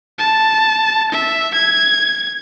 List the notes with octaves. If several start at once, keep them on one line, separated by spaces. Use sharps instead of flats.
A5
E5
G#6